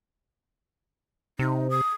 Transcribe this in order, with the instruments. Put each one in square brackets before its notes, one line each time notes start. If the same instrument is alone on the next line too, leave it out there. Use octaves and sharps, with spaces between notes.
[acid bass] C3 [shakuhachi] D#4
[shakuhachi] D#6